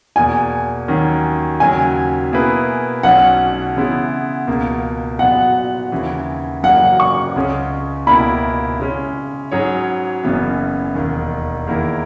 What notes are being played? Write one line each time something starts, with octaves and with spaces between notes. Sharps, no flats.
E2 B2 A#3 G#5
D#2 D#3 F#3 C#4
D#2 C#3 F#3 G#5
B2 A#3 E4 G#4 B4
B1 B2 F#3 C#4 F#5
C#3 E3 G#3 B3 E4
C#2 B2 A#3
A#2 F#3 B3 F#4 F#5
D#2 C#3 E3
F#2 C#3 F#3 A#3 F#5
C#6
C#2 C#3 G#3 C#4 G#4
C#2 B2 A#3 E4 B5
C#3 G#3 C#4
G#2 F#3 C#4 G#4 C#5
F#1 F#2 C#3 E3 B3
E1 D#2 D#3
E2 D#3 A#3 E4 A#4